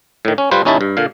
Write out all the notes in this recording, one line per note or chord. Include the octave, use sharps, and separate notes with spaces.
A2 D#3
C#4
G3 F4 B4 C5
D#2 C#4 D#4 E4 E5 A5
G2
A#2 D3 F5